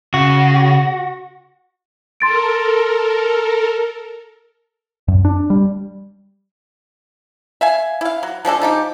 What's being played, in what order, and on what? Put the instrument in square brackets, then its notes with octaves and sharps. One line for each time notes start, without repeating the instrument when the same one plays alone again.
[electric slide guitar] C#3 [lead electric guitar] F#4
[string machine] A4 A#4 [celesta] C6 A6 D7
[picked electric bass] F#2
D4
G3
[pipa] E5 F5 G#5
E4 F5
F#3
F3 G#3 D4 A4
F3 D#4 G4